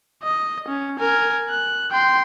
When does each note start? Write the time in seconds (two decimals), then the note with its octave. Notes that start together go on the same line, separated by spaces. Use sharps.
0.23 D#5
0.68 C#4
1.00 A#4 G#5
1.49 F#6
1.92 G5 C6